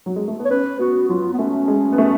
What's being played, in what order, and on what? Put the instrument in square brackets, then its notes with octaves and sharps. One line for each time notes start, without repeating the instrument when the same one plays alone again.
[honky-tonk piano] F#3
G#3
A3
B3
[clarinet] C#5
[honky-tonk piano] C#4 [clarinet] B4
[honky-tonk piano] B3 [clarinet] F#4
[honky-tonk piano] F#3 [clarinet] F4
[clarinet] B3
[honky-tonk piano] A3 [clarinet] C#4
[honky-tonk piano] G#3
B3
A3